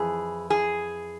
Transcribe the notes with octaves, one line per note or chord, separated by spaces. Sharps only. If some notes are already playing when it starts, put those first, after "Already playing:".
Already playing: F2 E3 G#4
G#4